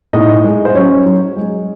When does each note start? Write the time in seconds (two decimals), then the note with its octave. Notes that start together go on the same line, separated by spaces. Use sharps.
0.13 A2 D#4 D#5
0.44 G#3
0.65 C5
0.75 F#3 C#4 C#5
1.06 F#3
1.37 G#3